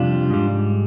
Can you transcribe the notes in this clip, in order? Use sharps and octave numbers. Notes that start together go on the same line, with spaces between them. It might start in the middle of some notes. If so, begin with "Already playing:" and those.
Already playing: F2 C3 G3 D4 F4
G#2 G3